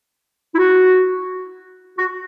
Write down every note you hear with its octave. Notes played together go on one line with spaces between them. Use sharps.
E4
F#4
F#4